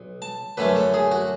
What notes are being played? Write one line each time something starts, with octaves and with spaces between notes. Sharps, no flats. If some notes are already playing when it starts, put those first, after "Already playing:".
Already playing: B1
A5
F#2 D3 A3 C#4 B4
A4
G#4
F#4